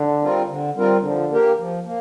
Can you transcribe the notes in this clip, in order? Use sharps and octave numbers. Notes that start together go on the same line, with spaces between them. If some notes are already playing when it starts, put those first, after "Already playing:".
Already playing: D3
G3 C4 F4 A#4
D3
G3 C4 F4 A#4
D3 F3
A#3 G4 A#4
F3
A#3